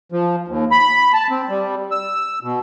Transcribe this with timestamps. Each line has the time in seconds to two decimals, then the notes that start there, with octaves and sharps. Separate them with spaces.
0.12 F3
0.48 D#2
0.71 B5
1.14 A5
1.30 C4
1.49 G3
1.91 E6
2.43 B2